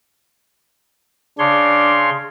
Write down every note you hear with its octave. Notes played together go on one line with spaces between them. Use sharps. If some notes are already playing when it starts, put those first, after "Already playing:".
C#3 D4 C#5 C6